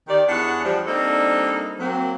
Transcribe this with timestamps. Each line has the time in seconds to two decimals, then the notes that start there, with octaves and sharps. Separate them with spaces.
0.08 D#3 G4 D5
0.28 E2 D4 G#4 C#5 F#5
0.64 F3 G3
0.87 G3 A#3 C4 D4 D#4 A4
1.79 F#3 A#3 C4